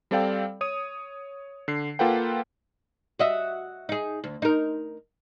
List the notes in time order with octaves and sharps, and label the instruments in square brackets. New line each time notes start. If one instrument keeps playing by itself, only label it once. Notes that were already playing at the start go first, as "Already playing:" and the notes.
[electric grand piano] G3 C4 A4 D5 F5 G5
C#5 D#6 D#7
D3 C7
A#3 F4 A4 B4 F#5 G5
[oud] F#4 D#5 E5
D#4 G#4
D2
D#4 A#4